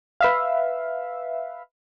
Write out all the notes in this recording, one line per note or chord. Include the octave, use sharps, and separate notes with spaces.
B4 E5 F5